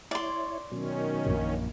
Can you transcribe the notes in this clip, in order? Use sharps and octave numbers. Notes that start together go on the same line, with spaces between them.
E4 C#5 D5 C6
B2 D#3 F#3 C#4
A#1 F#2 A#2